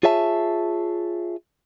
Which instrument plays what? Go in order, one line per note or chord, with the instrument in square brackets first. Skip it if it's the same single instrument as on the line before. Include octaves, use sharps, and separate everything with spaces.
[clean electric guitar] F4 G#4 C#5 E5 A5